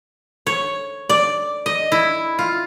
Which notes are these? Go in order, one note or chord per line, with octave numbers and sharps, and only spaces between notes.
C#5
D5
D#5
E4
F4